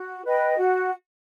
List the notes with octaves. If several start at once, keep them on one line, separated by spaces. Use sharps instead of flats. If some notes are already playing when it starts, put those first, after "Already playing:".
Already playing: F#4
B4 D#5 G5
F#4